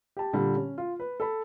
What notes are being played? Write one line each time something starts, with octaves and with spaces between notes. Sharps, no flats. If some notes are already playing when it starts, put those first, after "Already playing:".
G4 A5
A#2 D3 G3
C#4
F4
B4
A4 B5